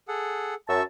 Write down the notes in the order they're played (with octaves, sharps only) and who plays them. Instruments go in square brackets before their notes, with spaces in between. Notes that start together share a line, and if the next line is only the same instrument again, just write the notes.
[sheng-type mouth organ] G#4 A4 F#5
[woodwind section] F#2 A5 [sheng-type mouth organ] E5 C#6 E6